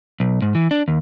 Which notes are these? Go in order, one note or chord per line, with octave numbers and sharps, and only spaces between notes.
B1
G#2
E3
D4
D#2